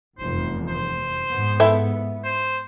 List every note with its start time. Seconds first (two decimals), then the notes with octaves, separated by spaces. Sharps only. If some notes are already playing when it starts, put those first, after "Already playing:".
0.18 F1 E2 G2 C5
0.67 C5
1.30 G#2 B3
1.60 E4 A4 E5
2.24 C5